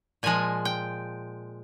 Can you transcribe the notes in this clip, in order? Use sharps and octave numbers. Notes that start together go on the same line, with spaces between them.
A#2 F3 G#3 G#5
G5